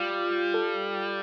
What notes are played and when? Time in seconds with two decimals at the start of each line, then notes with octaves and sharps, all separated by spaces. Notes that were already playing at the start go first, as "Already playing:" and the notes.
Already playing: G3 F4
0.54 A4